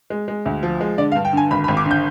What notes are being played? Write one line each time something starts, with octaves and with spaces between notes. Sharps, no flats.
G#3
G#3
D2
F3
G#3
D3 D5
F5
G2
G5
D3 G#5
G#1 B5
B5
G#1
D6
D3
G6